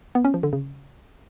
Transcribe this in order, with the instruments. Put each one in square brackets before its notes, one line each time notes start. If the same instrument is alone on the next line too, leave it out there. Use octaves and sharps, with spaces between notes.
[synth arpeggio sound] B3
C#4
F3
D3
C#3